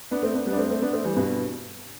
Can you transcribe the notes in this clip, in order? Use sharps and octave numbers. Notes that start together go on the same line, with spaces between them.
B3 D4
A3 C4
B3 D4
G3 B3
D4
A3 C4
A3 C4
B3 D4
A3 C4
E3 G3
G2 B2